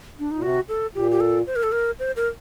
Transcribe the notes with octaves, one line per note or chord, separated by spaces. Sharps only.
D4
D#4
A#2
C3 F#4
A4
A#2 G4
G4
A4
C5
A#4
A4
A#4
C5
A#4